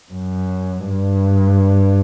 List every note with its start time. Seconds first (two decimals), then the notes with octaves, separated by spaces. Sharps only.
0.12 F#2
0.90 G2